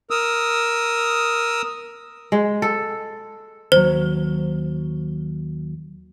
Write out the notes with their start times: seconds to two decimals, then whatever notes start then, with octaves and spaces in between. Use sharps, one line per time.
0.11 A#4 D#6 E6
2.32 G#3
2.62 A4
3.72 D#2 F#3 C5